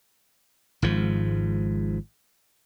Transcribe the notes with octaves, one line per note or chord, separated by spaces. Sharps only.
G#1 G#2 F3